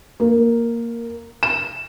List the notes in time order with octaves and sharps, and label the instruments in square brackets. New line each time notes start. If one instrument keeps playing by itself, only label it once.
[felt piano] A#3
E7